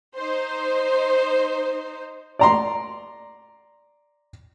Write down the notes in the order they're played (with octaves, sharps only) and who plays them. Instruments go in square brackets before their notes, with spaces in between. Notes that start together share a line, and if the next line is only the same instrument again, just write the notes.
[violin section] D#4 C5
[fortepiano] D5 A#5 C6